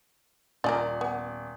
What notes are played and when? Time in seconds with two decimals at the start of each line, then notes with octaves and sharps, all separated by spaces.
0.64 D#1 F4 G#4 A#4 D5
1.01 B3